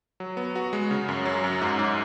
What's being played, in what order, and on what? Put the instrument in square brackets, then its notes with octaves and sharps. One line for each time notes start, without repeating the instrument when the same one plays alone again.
[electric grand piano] F#3
B3
F#4
G#3
C#3
F#2
F#3
F#2
G#2
G#2